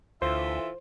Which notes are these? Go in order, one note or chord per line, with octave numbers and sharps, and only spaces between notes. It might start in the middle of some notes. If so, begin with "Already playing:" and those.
D2 E3 F4 A4 C5 E5